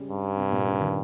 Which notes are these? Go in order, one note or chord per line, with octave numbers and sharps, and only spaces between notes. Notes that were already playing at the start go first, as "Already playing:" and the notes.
Already playing: C#3 G3 G#3
G2
C3
A#2
C#3
D#3